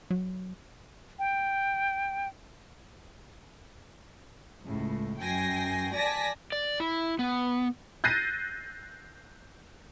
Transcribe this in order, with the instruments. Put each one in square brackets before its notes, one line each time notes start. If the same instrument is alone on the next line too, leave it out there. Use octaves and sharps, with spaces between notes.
[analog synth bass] F#3
[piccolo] G5
[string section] C#2 A2
F#2 G5 G#5 A#6 C7
D5 G#5 A5 A#6 B6
[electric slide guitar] D5
E4
B3
[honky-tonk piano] F#6 G6 A6 A#6 C7 D#7